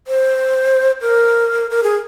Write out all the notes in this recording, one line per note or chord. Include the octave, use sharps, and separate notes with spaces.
C5
A#4
A#4
G#4